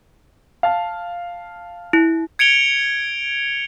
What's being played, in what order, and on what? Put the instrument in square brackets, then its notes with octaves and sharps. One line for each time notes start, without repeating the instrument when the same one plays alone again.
[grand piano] F5 A5
[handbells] E4
[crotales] G#6 C#7 D7 F7 G7